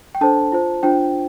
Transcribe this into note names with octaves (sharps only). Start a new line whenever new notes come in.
G5
D4 A4 C5 A5
F4 C5
D4 F4 C5 G5